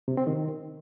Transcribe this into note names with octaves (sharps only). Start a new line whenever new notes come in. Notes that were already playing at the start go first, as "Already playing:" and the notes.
C3
C4
D#3